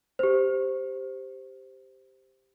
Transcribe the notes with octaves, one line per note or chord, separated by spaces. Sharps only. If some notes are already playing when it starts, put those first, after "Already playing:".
G4 C5